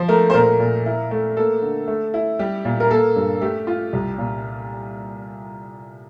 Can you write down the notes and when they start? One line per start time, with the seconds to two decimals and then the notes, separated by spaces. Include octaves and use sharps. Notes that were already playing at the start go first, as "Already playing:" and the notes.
Already playing: F3 C5
0.08 A3 A#4
0.30 C5
0.34 A#2 A#4
0.59 A#2
0.86 E4
1.11 A3
1.37 A#3 A4
1.62 D3
1.88 A3
2.14 E4
2.39 G3 G4
2.65 A#2
2.80 A#4
2.90 A#3 A4
3.16 G2
3.41 A3 G4
3.67 F4
3.93 C2
4.18 A#2